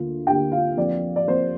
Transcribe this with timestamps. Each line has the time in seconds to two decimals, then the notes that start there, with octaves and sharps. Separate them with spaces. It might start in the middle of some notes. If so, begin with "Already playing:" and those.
Already playing: D2 D3 A#3 F4
0.27 D2 D3 A#3 G4 G5
0.52 F4 F5
0.77 F2 F3 A#3 D5
1.16 D5
1.27 F2 F3 A#3 C5